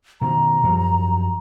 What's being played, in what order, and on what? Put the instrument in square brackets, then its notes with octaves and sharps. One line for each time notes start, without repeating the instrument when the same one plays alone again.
[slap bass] B2 D#3 [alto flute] A#5
[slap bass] F#2 F3 G3